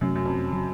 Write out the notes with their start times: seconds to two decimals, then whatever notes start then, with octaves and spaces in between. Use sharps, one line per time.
0.01 F#2 C3 F#3 A3 C#4
0.16 F#2
0.25 F2
0.52 C#3 F#3